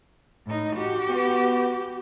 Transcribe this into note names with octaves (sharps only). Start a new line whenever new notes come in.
A2 D#4
F#4 G4
B3